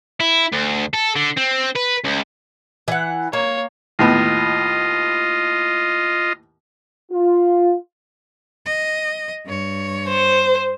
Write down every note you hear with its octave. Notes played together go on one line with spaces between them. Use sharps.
E4
D2
A4
D3
C4
B4
C#2
E3 F#5
A#3 C#5
D#2 A2 B3 F4 D#5
F4
D#5
G2 C#5
C5